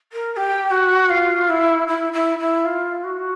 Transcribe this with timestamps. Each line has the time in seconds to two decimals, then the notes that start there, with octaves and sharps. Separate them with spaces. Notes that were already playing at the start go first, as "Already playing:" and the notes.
0.12 A#4
0.32 A#4
0.36 G4
0.70 F#4
1.09 F4
1.49 E4
1.87 E4
2.12 E4
2.38 E4
2.64 F4
3.03 F#4